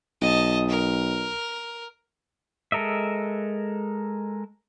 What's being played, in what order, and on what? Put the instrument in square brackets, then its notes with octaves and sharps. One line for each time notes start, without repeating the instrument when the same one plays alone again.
[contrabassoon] B1 [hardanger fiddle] D#5 A5
[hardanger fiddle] A#4
[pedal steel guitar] G#3 A4 A#4 D#5 E5